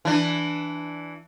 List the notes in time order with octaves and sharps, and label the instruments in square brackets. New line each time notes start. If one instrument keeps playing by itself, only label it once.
[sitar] E3 D4